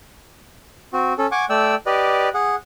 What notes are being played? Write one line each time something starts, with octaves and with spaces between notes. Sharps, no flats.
C4 F#4
C#4 A4
F#5 G#5 C#6 D6
A3 D5 G5 E6
G4 B4 D5 D#5
G#4 F#5